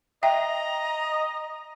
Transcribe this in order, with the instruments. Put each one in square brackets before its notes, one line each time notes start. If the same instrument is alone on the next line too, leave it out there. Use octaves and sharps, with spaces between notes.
[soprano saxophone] D#5 [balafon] E5 G5 [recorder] A#5